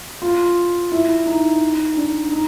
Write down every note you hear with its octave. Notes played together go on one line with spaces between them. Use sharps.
F4
E4
D#4
D4
D#4